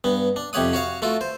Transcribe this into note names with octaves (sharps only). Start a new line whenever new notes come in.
G2 B3
D4
F2 C3 G4 C#5 F#5 D#6
F#4 C#5 F5
A3 F4 F#4 A4
C5